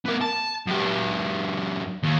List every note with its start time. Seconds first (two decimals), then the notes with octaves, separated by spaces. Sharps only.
0.06 B3 A#4
0.21 A5
0.67 F#2 G4
2.03 D#2